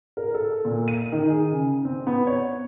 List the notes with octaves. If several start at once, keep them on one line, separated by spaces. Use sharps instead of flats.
A#4
A4
A#2
D#7
D#3
G#4
C#3
C4
B3
C#5